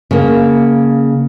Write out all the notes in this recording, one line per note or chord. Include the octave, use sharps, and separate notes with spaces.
C#3 A#3